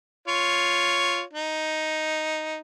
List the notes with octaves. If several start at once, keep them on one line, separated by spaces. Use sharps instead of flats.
F4 C#5
D#4